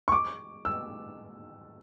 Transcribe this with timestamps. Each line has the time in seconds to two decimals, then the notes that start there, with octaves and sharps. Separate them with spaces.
0.08 C#6
0.12 D6
0.65 E6